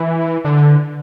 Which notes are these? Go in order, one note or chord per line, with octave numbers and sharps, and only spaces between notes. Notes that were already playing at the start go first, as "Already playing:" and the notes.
Already playing: E3
D3